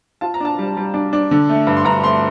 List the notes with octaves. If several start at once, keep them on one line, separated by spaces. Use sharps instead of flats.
F4 A5
A#5
D4 A5
G3
G3
D4
D4
D3
A3
G2
C6
G2 A#5
A3 C6